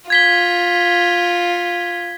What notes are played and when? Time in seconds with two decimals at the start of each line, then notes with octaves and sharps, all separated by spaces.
0.10 F4 G#6 B6 G7